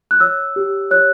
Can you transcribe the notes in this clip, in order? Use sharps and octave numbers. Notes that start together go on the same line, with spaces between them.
F#6
C#5 E6
G4
C#5 F#6